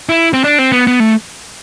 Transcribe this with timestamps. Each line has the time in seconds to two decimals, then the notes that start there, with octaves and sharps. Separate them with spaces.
0.09 E4
0.33 C4
0.44 D4
0.59 C4
0.72 B3
0.87 B3
1.00 A3